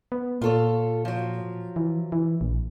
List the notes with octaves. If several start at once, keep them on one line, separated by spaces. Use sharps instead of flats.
B3
A#2 F4 A4 C#5
F3 F#3
E3
E3
A#1